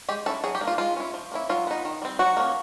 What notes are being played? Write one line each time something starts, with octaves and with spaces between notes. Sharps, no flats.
G#3 G4
C#4 E4 A4
F#3 G#4
G4
A#3 D4
F4
G#3 F4
C#4 E4
F3
A#3 C#4 E4
F#3 F4
B3 D#4
D#3
G3 C4
F#3 F#4
A#3 C#4